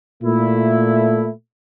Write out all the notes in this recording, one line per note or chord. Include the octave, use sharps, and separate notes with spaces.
A#2 A3 E4